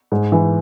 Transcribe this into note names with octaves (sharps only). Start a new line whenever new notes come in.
G#2
E3